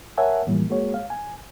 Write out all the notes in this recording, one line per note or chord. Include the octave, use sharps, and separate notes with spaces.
A#4 C#5 E5 F#5 G#5 A5
A2 E3 F3 G3 A#3
G#3 A#3 F#4 G#4 C#5
F5
G#5